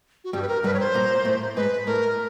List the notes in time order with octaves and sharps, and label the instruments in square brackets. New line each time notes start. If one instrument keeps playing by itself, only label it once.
[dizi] F#4
[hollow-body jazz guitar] G2 G3 [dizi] G4
[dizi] B4
A#4
[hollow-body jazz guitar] G2 G3 [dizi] B4
[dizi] C#5
C5
[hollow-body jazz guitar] A#2 A#3
A#3
A2 A3
[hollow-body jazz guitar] G#2 G#3 [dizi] B4
[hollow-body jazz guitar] A2 A3 [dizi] A#4